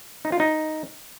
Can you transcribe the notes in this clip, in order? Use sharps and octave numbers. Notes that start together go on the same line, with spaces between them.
D#4
F4
D#4